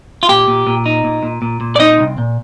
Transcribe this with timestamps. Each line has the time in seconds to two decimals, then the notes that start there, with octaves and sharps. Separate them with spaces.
0.23 F4
0.29 A#2 G4
0.48 A#2
0.67 A#2
0.86 D#4
1.04 A#2
1.23 A#2
1.42 A#2
1.61 A#2
1.76 D5
1.79 C4 D#4 D#5
1.99 C2
2.18 A#2